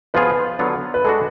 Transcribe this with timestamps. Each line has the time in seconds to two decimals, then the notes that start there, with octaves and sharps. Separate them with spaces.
0.14 F3 B3 F4 G#4 B4
0.59 D3 F#3 B3 F4
0.94 B4
1.04 G#3 D4 F#4 A4